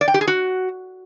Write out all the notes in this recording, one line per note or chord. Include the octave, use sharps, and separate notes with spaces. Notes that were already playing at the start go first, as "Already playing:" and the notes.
D5
G5
G4
G#4
F#4